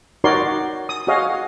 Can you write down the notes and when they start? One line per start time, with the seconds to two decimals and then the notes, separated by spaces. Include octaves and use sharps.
0.24 D#4 F#4 A#4 C#5 D5 C6
0.89 D#6
1.07 F#4 G#4 C#5 D#5 F5